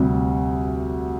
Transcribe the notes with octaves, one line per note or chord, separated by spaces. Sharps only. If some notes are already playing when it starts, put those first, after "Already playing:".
Already playing: D2 C3 G3